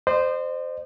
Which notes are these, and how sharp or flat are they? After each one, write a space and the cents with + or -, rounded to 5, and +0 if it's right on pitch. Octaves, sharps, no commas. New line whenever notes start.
C5 -10 D#5 -45